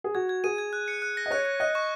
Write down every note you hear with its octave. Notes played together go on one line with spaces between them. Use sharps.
G#4
F#4 G#6
G#6
G#4 D#7
G#6
F#6
C#7
F#6
A#6
D#5
C#5 F#6
F#6
D#5 F#6
C#6